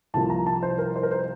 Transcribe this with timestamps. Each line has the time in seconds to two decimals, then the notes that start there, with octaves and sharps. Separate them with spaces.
0.14 C2 C3 F3 A#3 F4 A5
0.30 A#5
0.46 A5
0.63 C5
0.78 A#4
0.96 C5
1.03 A#4
1.11 C5